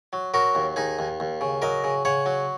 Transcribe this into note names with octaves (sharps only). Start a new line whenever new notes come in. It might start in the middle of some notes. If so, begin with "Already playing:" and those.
F#3
F#3 F#4 A#4
D#2
D#2 D#4 G#4
D#2
D#2
C#3
F#3 A#4 D#5
C#3
C#3 C#5 F#5
F#3